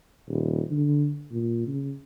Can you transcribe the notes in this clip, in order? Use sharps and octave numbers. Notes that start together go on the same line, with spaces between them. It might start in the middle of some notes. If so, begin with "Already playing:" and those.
D#1
D3
A#2
C#3